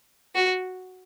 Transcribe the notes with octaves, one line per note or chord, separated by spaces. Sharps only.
F#4